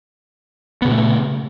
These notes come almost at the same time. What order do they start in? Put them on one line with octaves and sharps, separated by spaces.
B3 C#3 A#2 A3